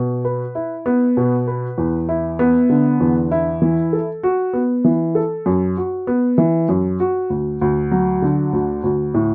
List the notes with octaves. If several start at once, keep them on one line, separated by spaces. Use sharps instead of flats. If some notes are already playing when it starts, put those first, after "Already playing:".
Already playing: B2
B4
E4
B3
B2
B4
E2
E4
B3
D3
E2
E4
E3
A4
F#4
B3
E3
A4
F#2
F#4
B3
E3
F#2
F#4
D2
D2
F#3
D3
D2
D2
A2